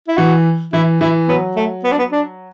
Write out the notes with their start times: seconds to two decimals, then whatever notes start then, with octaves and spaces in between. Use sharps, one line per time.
0.08 E4
0.17 E3 F#4
0.73 E3 E4
1.01 E3 E4
1.28 F#3 B3
1.56 A3
1.84 B3
1.92 D4
1.99 B3
2.12 D4